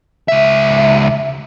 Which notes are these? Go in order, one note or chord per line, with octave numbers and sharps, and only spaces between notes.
C#2 E5